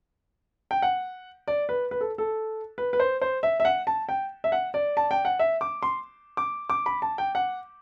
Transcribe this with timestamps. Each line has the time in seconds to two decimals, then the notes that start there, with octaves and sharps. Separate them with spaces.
0.71 G5
0.82 F#5
1.48 D5
1.69 B4
1.91 B4
2.01 A4
2.18 A4
2.78 B4
2.93 B4
3.00 C5
3.22 C5
3.43 E5
3.60 E5
3.65 F#5
3.87 A5
4.09 G5
4.44 E5
4.52 F#5
4.74 D5
4.97 A5
5.11 G5
5.25 F#5
5.39 E5
5.61 D6
5.83 C6
6.37 D6
6.70 D6
6.86 B5
7.02 A5
7.18 G5
7.35 F#5